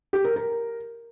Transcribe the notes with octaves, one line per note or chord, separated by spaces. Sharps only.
G4
A#4
A#4